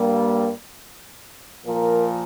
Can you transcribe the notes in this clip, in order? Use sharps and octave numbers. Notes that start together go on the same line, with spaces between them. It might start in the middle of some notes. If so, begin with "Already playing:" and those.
Already playing: G2 G3 A#3
A#2 F3 A#3 A#4